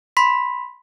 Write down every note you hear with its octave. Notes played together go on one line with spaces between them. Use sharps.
B5 C6 B6